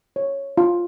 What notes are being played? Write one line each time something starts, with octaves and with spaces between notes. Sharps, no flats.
C#5
F4